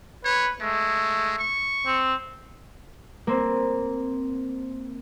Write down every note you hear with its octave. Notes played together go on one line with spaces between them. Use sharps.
B4 C#5
G#3 A3
C#6
C4
A#3 C4